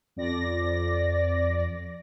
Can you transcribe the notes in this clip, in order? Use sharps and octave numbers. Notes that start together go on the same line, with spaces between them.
F2 D5 A#6